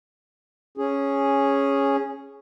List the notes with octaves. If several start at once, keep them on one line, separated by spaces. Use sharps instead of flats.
C#4 G#4